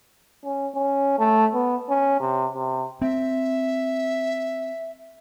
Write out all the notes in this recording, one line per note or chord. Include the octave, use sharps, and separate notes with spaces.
C#4
C#4
A3
B3
C#4
C3
C3
C4 E5